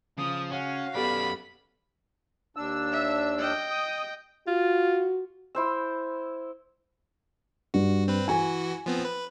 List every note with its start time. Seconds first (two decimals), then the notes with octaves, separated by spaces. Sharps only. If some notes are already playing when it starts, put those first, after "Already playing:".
0.18 C#3 F3 D#6
0.51 C#4 F#4 F5
0.95 F#2 B3 G4 A4 D5 B5
2.56 D#2 D4 E6
2.92 E5
3.39 D#5 G5
3.70 D#6
4.47 F4 F#4
5.55 E4 C5 E6
7.74 G2 F#4
8.08 C4 B4
8.28 E3 F#4 G#5
8.86 F3 B3 C4
9.05 B4